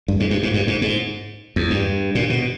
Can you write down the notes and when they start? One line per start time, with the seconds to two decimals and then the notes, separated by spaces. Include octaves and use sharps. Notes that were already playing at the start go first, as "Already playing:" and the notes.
0.08 G2
0.20 G#2
0.31 G2
0.43 G#2
0.54 G2
0.67 G#2
0.82 G#2
1.56 E2
1.70 G2
2.15 A#2
2.30 B2